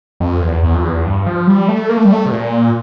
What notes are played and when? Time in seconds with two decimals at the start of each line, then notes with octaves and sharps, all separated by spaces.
0.20 F2
0.42 E2
0.63 E2
0.75 F2
0.84 E2
1.05 G2
1.26 F3
1.47 G3
1.68 A3
1.89 A#3
1.97 A3
2.05 G3
2.13 A3
2.26 C3
2.32 A#2